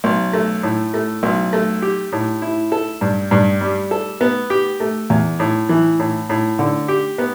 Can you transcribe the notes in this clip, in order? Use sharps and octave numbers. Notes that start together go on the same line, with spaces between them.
B1
A3
A2
A3
B1
A3
G4
A2
E4
A4
G2
G2
G3
A4
B3
G4
A3
E2
A2
E3
A2
A2
D3
G4
B3